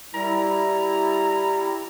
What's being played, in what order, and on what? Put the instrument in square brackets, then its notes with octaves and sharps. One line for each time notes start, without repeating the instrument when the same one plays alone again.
[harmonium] G3 E4 [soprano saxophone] A#5